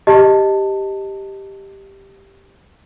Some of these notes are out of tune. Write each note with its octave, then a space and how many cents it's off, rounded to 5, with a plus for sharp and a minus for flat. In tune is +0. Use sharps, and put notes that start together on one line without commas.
G4 +0 D#5 +0 A5 +15